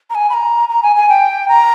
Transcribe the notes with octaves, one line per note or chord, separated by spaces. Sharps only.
A#5
G#5
B5
A#5
A#5
G#5
G#5
G5
A#5